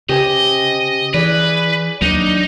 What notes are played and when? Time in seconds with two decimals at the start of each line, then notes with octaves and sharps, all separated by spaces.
0.09 C#3 G4 C5 D#5 G#5
1.14 E3 G#4 B4 D5
2.02 D#2 F#3 A#3 D4 D#4